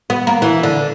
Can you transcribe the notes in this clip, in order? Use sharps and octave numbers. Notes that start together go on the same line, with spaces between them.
B3
A#3
E3
D3